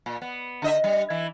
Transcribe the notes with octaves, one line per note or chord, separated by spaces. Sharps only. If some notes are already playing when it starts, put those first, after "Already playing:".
A#2
B3
D3 D#5 E5
G3
E3 E4